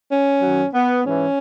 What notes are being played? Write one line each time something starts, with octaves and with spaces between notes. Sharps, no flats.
C#4
F#2 D#3 F#3
B3
G#2 E3 C#4